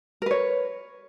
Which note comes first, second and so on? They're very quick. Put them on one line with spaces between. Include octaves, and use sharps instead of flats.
A#4 B4 C#5